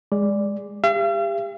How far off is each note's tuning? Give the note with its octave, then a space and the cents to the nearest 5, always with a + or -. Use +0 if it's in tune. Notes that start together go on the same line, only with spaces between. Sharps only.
G#3 -15 D5 -5
G4 +30 F5 -45